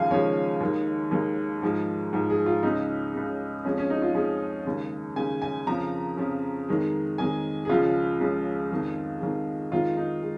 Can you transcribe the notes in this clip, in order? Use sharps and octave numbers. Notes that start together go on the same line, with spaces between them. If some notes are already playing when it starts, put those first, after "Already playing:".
Already playing: D#2 C#3 F3 G#3 F5 G#5
D#2 C#3 F3 G#3 C#5
D#2 D#3 G#3
D#2 D#3 G#3
G#2 F3 G#3
G#2 F3 G#3
G#4
F4
C#2 C#3 G#3 D#4
C#2 C#3 G#3
F2 F3 G#3 C#4
C#4
D#4
F4
F2 F3 G#3 G#4
D#2 C#3 G#3
D#2 C#3 G#3 G#5
G#5
F2 C#3 F3 A#5
F2 C#3 F3
F2 D#3 G#3
F2 D#3 G#3 G#5
G#4
C#2 C#3 F3 G#3 F4
C#2 C#3 F3 G#3
F2 D#3 G#3
F2 D#3 G#3
F2 D#3 G#3 F4
D#4
G#3